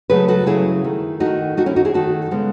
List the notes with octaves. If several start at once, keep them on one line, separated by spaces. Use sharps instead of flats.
C#3 F#3 A3 G#4 B4
F#4 A4
C#3 F#3 A3 E4 G#4
D#3 A3
D#3 A3 D#4 F#4
D#3 A3 D#4 F#4
C#4 E4
D#4 F#4
E4 G#4
D#3 A3 F#4 A4
C#3 G#3 B3